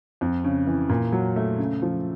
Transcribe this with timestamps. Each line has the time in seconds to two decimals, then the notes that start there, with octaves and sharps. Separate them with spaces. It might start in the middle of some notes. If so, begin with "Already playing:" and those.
0.21 F2
0.44 C#3
0.67 E3
0.89 A#2
1.12 F#3
1.36 A3
1.58 C#3
1.82 F3